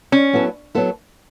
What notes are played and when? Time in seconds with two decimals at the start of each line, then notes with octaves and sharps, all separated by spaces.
0.12 C#4
0.33 F#3 B3 E4 A4
0.75 F#3 B3 E4 A4